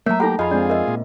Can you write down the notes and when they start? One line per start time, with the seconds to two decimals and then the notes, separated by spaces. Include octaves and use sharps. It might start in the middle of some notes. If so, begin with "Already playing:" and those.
0.06 F#3 A3 A#3 C#5 E5 A#5
0.20 D#4 G4 A4 F#5 A#5 B5
0.39 F2 F4 G#4 D#5 F5 B5
0.51 G#3 C4 D4 D5
0.70 A#4 D#5 E5
0.88 A#2